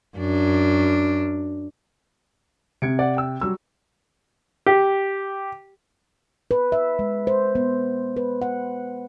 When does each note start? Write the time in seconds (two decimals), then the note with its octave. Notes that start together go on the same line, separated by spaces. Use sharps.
0.17 F#2 D4
2.82 C3 G#6 C#7 D7
2.99 D5 F#5
3.17 G5 E6
3.41 F#3 G3 E6
4.66 G4
6.51 B4
6.72 E5
6.99 G#3
7.27 C5
7.55 B3
8.17 B4
8.42 F#5